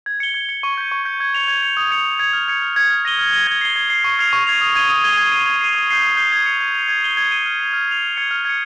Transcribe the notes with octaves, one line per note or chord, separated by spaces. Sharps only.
G#6
C#7 G7
G#6
C#7 G7
C#6
G6 C#7
C#6
G6 C#7
G#6
C#7 F7
G#6
C#7 F7
D#6
G#6 C#7 F7
D#6
G#6 C#7 F7
F6
G#6 C#7
F6
G#6 C#7
F6
A#6 D#7 G7
F6
A#6 D#7 G7
G#6
C7 G7
G#6
C7 G7
C#6
F6 G#6 C7 F7
C#6
F6 G#6 C7 F7
D#6
G#6 D#7 G7
D#6
G#6 D#7 G7
G#6
C7 D#7
G#6
C7 D#7
D#6
G6 C7 G7
D#6
G6 C7 G7
G#6
C#7 F7
G#6
C#7 F7
G#6
D#7 G7
G#6
D#7 G7
F6
C7 F7
F6
C7 F7
F6
G#6 C#7
F6
G#6 C#7